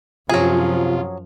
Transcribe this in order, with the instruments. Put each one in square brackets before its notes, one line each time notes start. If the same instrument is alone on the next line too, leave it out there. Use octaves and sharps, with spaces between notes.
[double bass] F#2 F3 [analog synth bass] C3 [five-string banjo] F#3 G#4 [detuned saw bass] F4